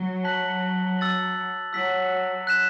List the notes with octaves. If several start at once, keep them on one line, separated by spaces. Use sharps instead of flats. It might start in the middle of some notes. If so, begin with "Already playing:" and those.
Already playing: F#3
A5 F#6 B6 F#7
E6 A6 F#7
F#3 E6 B6 F#7
F#6 B6 E7